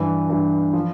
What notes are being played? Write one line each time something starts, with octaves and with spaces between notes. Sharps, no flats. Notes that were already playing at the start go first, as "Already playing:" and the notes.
Already playing: G2 E3
G2 E3
F3